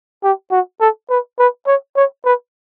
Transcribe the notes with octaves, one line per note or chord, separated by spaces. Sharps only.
G4
F#4
A4
B4
B4
C#5
C#5
B4